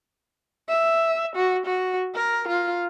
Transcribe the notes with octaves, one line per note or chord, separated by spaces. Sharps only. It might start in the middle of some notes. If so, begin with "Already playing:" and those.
E5
F#4
F#4
A#4
F4